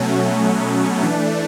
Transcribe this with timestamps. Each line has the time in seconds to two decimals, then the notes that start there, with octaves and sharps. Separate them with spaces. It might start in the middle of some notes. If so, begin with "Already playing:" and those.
Already playing: B2 F#3 A3 C#4
1.02 E3 A3 D4